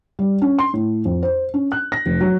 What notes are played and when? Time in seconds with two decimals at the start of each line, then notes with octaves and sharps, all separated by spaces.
0.19 G3
0.42 C#4
0.59 C6
0.74 A2
1.05 F2
1.23 C5
1.54 C#4
1.72 F#6
1.92 A#6
2.06 F1
2.20 F#3